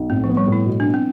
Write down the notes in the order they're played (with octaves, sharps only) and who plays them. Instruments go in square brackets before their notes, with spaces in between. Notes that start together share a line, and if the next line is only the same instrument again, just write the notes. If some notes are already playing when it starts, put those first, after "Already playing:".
Already playing: [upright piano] B1
[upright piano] A2 [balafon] C4
[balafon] F3
[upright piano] B3
[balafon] G3
[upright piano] A2
[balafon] E4
[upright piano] B2
[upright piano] B3 [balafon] D4
[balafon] C4